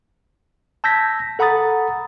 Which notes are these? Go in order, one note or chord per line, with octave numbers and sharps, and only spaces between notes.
A5 E6 G6 G#6 A#6 B6
A4 F#5 A#5 B5 D#6 A6